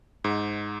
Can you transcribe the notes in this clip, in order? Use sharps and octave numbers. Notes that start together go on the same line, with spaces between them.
G#2